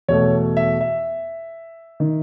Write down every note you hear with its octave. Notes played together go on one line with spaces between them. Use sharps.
E2 B2 A3 C#5
E5
E5
D#3